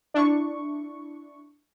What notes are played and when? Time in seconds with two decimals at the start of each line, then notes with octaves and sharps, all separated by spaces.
0.14 D4 E4 C#6